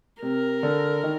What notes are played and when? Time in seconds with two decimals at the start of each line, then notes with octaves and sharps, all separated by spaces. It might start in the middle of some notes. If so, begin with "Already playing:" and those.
0.22 C3 A#4
0.63 D3
1.03 D#3